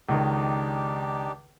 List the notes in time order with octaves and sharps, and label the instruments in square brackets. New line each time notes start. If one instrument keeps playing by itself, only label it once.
[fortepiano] C#2 D#3 [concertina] D4 D#4 G4